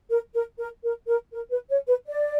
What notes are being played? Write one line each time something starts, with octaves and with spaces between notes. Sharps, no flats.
A#4
A#4
A#4
A#4
A#4
A#4
B4
C#5
B4
D5